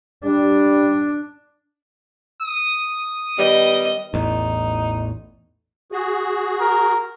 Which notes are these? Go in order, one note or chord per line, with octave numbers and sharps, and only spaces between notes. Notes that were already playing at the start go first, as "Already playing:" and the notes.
G3 D4
D#6
D#3 G3 B3 D#5
A1 E2 D#4
F#4 G#4
A#4